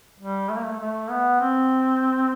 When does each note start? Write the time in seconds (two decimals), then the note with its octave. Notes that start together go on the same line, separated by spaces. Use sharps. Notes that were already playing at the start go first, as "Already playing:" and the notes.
0.20 G3
0.50 A3
0.56 A#3
0.64 A3
0.80 A3
1.10 B3
1.41 C4